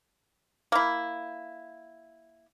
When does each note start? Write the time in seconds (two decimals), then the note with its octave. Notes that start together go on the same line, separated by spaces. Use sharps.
0.72 A#3 E4